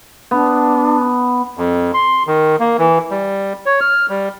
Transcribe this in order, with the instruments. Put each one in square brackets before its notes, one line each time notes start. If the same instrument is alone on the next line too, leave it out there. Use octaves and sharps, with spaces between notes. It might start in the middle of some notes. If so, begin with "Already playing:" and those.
[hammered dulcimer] B3 [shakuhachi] D4
[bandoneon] F2
C6
D#3
A#3
E3
G3
C#5
F6
G3